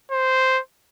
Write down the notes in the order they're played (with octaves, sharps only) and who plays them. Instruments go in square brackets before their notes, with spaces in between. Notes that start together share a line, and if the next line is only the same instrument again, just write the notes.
[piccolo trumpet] C5